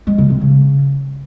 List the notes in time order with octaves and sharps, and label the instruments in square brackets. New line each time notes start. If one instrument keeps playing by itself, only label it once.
[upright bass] G#3
C#3
C3
C#3